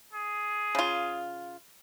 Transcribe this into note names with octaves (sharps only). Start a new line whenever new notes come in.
G#4
C#3 F4